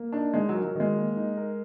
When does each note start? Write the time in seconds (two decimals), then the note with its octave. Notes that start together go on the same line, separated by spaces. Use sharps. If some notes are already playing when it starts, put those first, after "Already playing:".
Already playing: A#3
0.12 D4 D#4
0.34 G#3 D#4
0.49 F#3
0.54 A#4
0.65 F#3
0.75 D#3 G#3
0.96 A#3
1.16 D#4
1.37 A#4